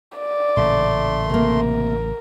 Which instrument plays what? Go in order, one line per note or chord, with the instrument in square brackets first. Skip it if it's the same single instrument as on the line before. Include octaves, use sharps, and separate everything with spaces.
[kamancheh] D5
[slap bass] A1 A#2 C#3 [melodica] A3 C6
[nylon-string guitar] C3 A#3 [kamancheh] A#4